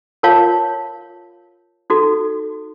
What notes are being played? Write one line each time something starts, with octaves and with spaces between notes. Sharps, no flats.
F4 A#4 C#5 F5 A5
D#4 F#4 A4